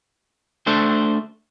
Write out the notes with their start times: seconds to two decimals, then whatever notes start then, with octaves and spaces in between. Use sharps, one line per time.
0.67 A3 D4 C5